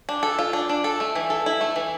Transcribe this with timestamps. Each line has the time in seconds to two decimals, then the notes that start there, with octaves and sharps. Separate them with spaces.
0.09 D4
0.23 A4
0.39 F4
0.53 D4
0.69 D4
0.84 A4
1.00 A3
1.15 E3
1.30 A4
1.46 E4
1.61 A3
1.76 E3